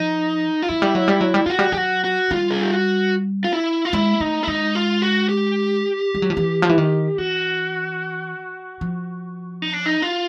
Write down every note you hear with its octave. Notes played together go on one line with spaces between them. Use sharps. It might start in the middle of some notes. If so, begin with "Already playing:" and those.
Already playing: F3 D#4
F4
F#3 E4
G3
F#3
G3
F#3
G3
F#3 F4 F#4
G3
F#3 G4
F#4
F#4
G3 F4
G#4
G4
F#4
F4
E4
F4
G#3 E4
A3 D#4
E4
G#3 D#4
F4
F#4
G4
G3
F#3
F3
E3
F3
E3
D#3
E3 F#4
F3
D#4
D4
D#4
F4